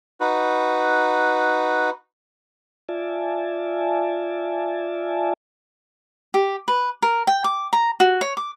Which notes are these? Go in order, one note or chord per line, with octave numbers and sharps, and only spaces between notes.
D#4 F#4 B4
F4 D5 E5 G#5 A5
G4
B4
A#4
G5
D6
A#5
F#4
C#5
D6